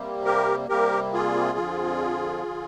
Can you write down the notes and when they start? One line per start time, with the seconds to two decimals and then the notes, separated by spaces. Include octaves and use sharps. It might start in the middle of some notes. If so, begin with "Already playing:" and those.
Already playing: C3 G3 A#3
0.25 G4 A#4
0.69 C3 G3 A#3 G4 A#4
1.13 F4 G#4
1.58 F2 D3 F3
2.47 D3 F3